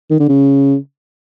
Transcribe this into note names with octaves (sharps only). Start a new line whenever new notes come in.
D#3
D3
C#3